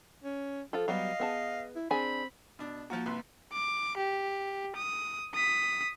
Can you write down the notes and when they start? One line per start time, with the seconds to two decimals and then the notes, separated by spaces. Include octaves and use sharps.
0.24 C#4
0.73 F3 F4 A4
0.88 F#3 G3 B3 D#5 F5
1.20 B3 G#4 A5
1.76 E4
1.91 C4 D4 G#4 G#5 B5
2.59 B2 D4
2.90 F3 A#3 F4 F#4
3.06 C2 B4 C6
3.53 D6
3.97 G4
4.76 D#6
5.35 D#6 B6